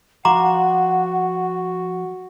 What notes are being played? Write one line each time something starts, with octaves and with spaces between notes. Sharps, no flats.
F3 F#4 F5 F#5 A#5 C6 D6